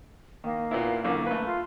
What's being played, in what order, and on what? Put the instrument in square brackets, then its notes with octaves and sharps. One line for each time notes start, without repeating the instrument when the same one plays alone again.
[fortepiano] D#3 [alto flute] A#3
[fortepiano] A#2 B3 E4
F#2 D3 E3
A3 B4
[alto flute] F4